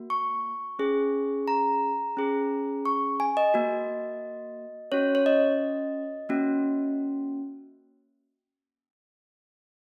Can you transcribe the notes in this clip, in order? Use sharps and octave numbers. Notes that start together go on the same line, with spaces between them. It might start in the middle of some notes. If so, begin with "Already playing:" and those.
Already playing: A#3 F#4
C#6
C#4 G#4
A#5
C#4 G#4
C#6
G#5
D#5
A#3 F#4
C#4 F#4 C#5
C#5
D#5
A#3 C#4 F#4